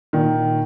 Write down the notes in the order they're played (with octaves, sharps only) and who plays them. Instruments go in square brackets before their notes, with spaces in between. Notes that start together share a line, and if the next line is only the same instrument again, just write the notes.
[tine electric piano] A#2 [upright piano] D#3